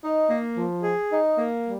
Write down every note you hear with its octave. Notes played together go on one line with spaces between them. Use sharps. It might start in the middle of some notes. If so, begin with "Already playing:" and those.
D#4
A#3
F3
G#4
D#4
A#3
G3